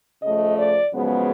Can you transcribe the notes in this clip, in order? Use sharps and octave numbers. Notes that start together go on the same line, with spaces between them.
C#3 F3 A3 D#5
D5
F#2 C#3 F3 G#3 B3